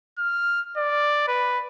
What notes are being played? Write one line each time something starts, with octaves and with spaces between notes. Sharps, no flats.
F6
D5
B4